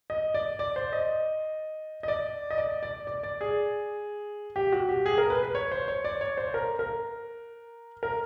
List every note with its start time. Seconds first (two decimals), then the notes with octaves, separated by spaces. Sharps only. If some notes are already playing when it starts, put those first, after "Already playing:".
0.10 D#5
0.34 D5
0.59 D5
0.76 C5
0.93 D#5
2.03 D#5
2.08 D5
2.51 D#5
2.58 D5
2.83 D5
3.07 D5
3.23 D5
3.41 G#4
4.56 G4
4.72 F#4
4.89 G4
5.06 G#4
5.18 A#4
5.30 B4
5.43 B4
5.55 C#5
5.72 C5
5.88 C#5
6.04 D5
6.21 C#5
6.37 C5
6.54 A#4
6.79 A#4
8.03 A#4